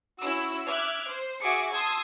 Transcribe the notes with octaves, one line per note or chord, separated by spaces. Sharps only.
C#4 E4 F#4 E6
E5 D6 F6 F#6 G#6
C5
F#4 G#4 E5 G#5 D6 C#7
A5 C6 D#6 E6 G#6